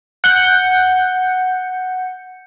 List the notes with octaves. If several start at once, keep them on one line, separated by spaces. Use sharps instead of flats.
F#5 G6 C#7